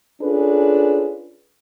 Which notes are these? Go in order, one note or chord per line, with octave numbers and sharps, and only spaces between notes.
C#4 D4 F4 G#4 A4 B4